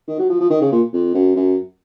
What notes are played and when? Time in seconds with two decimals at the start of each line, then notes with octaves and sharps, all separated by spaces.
0.08 D#3
0.19 F#3
0.29 F3
0.40 F3
0.50 D#3
0.61 C#3
0.72 A#2
0.93 F2
1.14 F#2
1.36 F#2